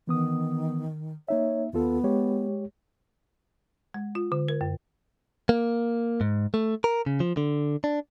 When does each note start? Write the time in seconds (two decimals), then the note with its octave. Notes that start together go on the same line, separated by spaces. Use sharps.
0.07 D#3 E3 B3 D#6
1.28 A#3 D#4 C#5 E5
1.73 D#2 B3 F4 A4
2.04 G#3 G4 C#5
3.94 G#3
4.15 F4
4.32 D3
4.48 A#4
4.61 F#2
5.49 A#3
6.21 G#2
6.54 A3
6.84 A#4
7.06 C#3
7.20 F3
7.37 D3
7.84 D4